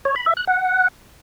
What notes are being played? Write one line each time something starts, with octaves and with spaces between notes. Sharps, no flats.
C#5
B5
E5
F#6
F#5